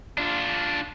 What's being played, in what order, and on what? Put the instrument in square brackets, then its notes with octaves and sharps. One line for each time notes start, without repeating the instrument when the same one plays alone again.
[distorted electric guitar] D4 F4